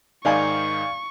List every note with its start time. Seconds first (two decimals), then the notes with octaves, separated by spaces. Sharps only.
0.25 G#2 D#3 D#4 D5 F5 G#5 C#6